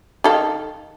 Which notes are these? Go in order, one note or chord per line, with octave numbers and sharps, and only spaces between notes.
D#3 A4 F5